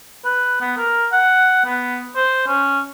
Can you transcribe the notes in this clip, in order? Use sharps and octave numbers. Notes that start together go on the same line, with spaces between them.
B4
B3
A#4
F#5
B3
C5
C#4